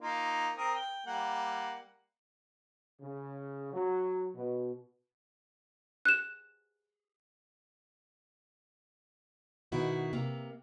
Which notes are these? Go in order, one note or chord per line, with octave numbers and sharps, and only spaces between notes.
A#3 D#4 F4
C4 A#4 D#6
G5
G3 A#3 F#5
C#3
F#3
B2
F#6 E7
B2 D#3 E4 F#4
C3 A#3